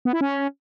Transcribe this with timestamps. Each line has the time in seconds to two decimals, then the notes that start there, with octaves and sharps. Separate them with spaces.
0.05 B3
0.13 E4
0.21 C#4